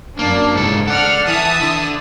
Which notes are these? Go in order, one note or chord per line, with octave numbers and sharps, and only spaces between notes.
F#2 A#3 D4
G#2 C#3 A4
A4 D5 F#5 F6
E3 E5 A5 D#6
D3